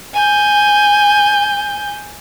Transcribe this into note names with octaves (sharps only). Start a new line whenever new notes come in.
G#5 G6